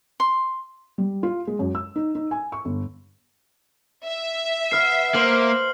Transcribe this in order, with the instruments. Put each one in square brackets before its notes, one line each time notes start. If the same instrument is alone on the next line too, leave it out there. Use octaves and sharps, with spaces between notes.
[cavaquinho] C6
[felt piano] G3
F4
G#3
F#2
E6
D#4
D#4
G#5
C#6
G1
[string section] E5
[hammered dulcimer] B4 F#5 [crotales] F6 C7
[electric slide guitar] A#3 [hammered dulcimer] C5 [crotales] F6 F#7